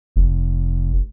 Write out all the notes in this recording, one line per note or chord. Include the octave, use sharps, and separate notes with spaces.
F1